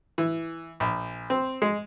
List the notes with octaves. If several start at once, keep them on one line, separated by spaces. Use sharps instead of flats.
E3
A#1
C4
G#3